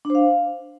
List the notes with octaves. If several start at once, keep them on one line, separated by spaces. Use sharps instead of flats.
D4
C5
F5